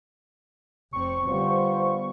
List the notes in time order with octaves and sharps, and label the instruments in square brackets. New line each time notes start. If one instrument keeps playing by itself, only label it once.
[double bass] F1 C4 [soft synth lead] C#6
[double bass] D3 G3 [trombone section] B3 F4 C5